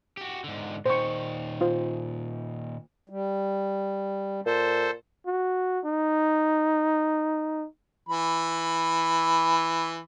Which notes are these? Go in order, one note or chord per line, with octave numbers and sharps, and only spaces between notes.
F#4 G4
G#2 D3
A#2 D#3 C5 C#6
F4 C5
G3
A#2 A4 C5
F#4
D#4
E3 B5